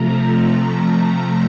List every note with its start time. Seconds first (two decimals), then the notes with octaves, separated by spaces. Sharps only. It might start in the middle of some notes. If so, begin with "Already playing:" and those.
Already playing: C3 F3 A3 A#5
0.76 A#5
1.10 A#5